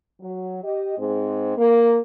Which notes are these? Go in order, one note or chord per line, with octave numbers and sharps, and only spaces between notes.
F#3
G4 D#5
G#2 G#3 C4
A#3